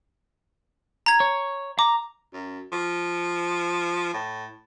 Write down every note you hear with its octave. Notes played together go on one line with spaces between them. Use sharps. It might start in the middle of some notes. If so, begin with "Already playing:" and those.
A#5 G#6
C#5
A#5 D6
F#2
F3
A2